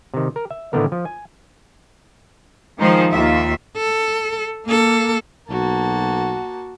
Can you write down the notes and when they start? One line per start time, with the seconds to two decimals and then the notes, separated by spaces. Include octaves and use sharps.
0.14 C3 D#3
0.36 A#4
0.51 E5
0.73 A2 D3 D#3 A3 B3 A#4
0.92 F3
1.05 G#5
2.78 D#3 F3 G#3 D#4 C5
3.12 D#2 F4 E5
3.77 A4
4.66 A#3 A4
5.50 B1 A#3 F#4 A5